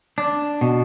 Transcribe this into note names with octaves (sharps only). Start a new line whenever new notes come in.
D4
B2